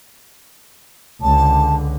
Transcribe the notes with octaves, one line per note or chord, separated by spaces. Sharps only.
C#2 D3 A5